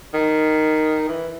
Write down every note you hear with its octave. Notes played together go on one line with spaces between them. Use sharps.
D#3
E3